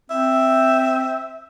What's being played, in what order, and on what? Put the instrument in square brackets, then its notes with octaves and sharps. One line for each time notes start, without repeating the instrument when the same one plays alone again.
[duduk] C4 [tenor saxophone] E5